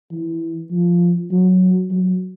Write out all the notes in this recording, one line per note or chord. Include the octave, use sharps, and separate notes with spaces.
E3
F3
F#3
F#3